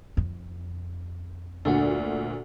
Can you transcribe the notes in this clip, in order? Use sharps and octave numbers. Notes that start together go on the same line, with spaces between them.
F2
D2 A#2 D3 D4 F#4